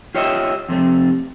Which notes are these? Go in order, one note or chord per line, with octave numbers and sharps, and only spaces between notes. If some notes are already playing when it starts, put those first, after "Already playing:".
F4 G4 C#5 D#5 E5
F2 C3 A3